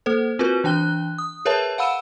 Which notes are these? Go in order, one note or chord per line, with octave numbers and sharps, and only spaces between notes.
A#3 A4 C5
C4 F4 F#4 A#4 B4
E3 D4 G5 F#6 G7
D#6
G#4 A#4 B4 C#5 E5 A5
F5 F#5 B5 E6 D#7 E7